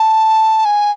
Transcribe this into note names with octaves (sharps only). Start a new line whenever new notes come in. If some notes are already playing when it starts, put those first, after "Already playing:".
Already playing: A5
G#5